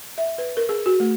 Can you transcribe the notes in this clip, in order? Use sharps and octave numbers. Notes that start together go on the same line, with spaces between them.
E5
B4
A#4
G#4
F#4
A3